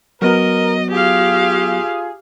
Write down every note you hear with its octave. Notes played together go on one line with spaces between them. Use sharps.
F#3 B3 F#4 A#4 D#5
F4 G4 G#4 F5